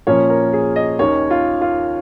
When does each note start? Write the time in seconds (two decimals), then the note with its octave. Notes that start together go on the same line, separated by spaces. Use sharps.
0.07 A#2 F3 A#3 C#4 C#5
0.30 A#4
0.53 G#4
0.76 D#5
0.99 D#2 D#3 C#4 C#5
1.30 F4
1.61 F4